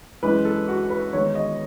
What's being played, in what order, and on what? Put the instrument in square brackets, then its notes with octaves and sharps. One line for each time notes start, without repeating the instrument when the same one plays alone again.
[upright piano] F#2 E3 G#3 B4
A4
F#4
B4
E2 D#3 G#3 C#5
D#5